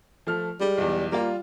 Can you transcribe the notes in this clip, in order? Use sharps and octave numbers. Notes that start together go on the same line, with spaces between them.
F3 A3 F6
G3 G#3
B1 E2
G3 A#3 F4